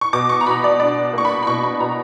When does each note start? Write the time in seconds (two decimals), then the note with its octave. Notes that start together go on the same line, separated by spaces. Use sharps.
0.01 C#6
0.13 B2 D6
0.29 C#6
0.41 A#5
0.47 B2 B5
0.64 D5
0.80 D4 D5
1.13 A#3 C#6
1.25 B5
1.43 B5
1.47 B2 C#6
1.63 B5
1.80 B2 A#5